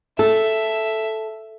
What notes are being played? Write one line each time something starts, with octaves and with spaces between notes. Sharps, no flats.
A4 E5